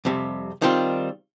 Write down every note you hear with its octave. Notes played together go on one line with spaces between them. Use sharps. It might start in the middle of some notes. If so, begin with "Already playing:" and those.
F2 C3 G3
D#3 G3 C4 F4